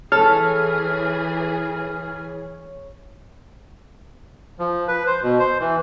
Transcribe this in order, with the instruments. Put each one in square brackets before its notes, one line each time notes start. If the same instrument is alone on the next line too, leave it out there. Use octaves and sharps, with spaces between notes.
[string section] E3 G#4 [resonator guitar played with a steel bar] A4 [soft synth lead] C#5 [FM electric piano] F6
[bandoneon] F3
B4
C5
B2
C5
E3